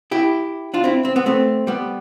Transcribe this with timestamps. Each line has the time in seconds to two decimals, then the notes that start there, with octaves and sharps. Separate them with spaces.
0.11 E4 G4
0.74 D4 F4
0.84 C4 E4
1.05 C4
1.16 B3
1.26 A3 C4
1.67 G3 B3